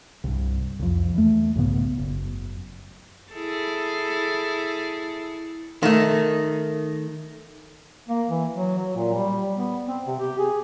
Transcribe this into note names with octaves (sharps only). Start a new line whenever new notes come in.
C2 G2
C2 F2
E2 A3
B1 G#2 C#3 B3
F#1
E4 G#4 A4
D#3 A3
A#3
E3
F#3
F#3
A#2
G3
B3
C4
C3
G4
G#4